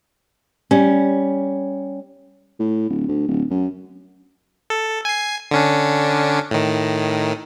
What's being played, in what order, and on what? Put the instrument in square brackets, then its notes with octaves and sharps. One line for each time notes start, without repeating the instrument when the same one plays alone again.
[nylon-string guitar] G3 C#4
[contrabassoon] A2
D1
D2
D1
F#2
[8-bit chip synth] A4
G#5 C7
D3 C#4 D4
A2 D#3